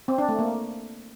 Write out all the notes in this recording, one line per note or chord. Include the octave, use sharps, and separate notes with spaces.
C4
D4
A3
A#3